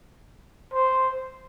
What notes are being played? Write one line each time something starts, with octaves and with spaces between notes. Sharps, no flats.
C5